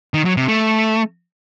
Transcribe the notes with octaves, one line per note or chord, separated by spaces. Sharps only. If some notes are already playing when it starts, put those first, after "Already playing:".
D#3
F#3
C3
A3